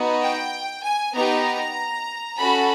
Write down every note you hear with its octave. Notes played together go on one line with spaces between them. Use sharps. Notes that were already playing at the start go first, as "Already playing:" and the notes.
Already playing: B3 D#4 F#4
G5
G#5
B3 D#4 G4 A#5
C#4 F#4 A4 B5